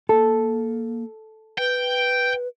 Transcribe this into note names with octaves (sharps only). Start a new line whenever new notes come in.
A#3 A4
B4 G5